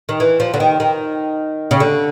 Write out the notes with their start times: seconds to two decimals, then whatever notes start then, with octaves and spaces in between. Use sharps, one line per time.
0.09 D#3
0.20 E3
0.40 F3
0.54 D3
0.60 D#3
0.80 D#3
1.71 C#3
1.80 D3